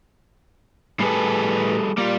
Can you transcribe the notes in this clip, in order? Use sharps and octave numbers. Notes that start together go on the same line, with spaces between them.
A2 G3 G#4 A4 B4
G3 A#3 F4